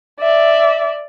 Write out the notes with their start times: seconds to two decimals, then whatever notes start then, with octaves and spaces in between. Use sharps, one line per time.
0.20 D5 E5